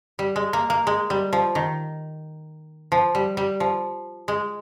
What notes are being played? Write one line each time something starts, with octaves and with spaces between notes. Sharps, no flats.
G3
G#3
A#3
A#3
G#3
G3
F3
D#3
F3
G3
G3
F3
G#3